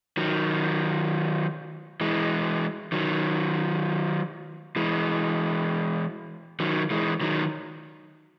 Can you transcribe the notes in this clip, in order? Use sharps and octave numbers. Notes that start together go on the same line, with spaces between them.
D#3 F#3
E3 G#3
D#3 F#3
E3 G#3
D#3 F#3
E3 G#3
D#3 F#3